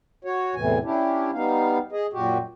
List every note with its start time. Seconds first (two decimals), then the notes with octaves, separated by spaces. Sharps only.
0.25 F#4 C#5
0.55 E2 A2 C3 E3 G#5
0.84 C#4 D4 E4 G4
1.34 G3 B3 D#4 F5
1.92 G#4 D#5
2.13 F#2 A#2 F#4 G4